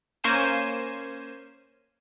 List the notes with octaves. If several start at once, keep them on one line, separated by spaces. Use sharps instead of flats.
A#3 C#4 C5 G#5 E7